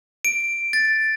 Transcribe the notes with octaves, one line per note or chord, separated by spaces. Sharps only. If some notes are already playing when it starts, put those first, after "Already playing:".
D7
A6